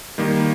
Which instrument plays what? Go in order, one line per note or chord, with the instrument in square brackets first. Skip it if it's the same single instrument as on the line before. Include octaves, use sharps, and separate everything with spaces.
[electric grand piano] D#3 G3 A#3